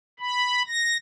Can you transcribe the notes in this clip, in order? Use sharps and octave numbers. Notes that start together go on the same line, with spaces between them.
B5
A#6